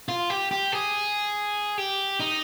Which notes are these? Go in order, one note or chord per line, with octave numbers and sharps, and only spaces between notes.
F4
G4
G4
G#4
G4
D#4